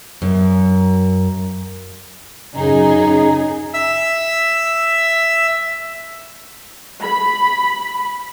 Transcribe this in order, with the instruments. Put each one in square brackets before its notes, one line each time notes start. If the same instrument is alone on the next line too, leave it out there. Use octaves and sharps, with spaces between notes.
[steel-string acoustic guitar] F#2
[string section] F#2 C#3 D#4 G#4
[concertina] E5 E6
[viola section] B5